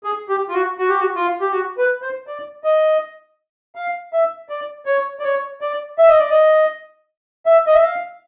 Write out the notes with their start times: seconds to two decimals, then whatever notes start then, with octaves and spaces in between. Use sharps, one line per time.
0.04 G#4
0.29 G4
0.49 F4
0.53 F#4
0.78 F#4
0.89 G4
1.00 F#4
1.15 F4
1.41 G4
1.52 F#4
1.78 B4
2.02 C5
2.27 D5
2.64 D#5
3.75 F5
4.13 E5
4.49 D5
4.86 C#5
5.19 D5
5.24 C#5
5.61 D5
5.98 E5
6.08 D#5
6.19 D5
6.30 D#5
7.46 E5
7.67 D#5
7.75 E5
7.84 F5